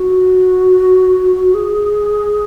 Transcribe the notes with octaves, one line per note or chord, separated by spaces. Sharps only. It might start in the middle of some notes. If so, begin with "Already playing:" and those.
Already playing: F#4
G#4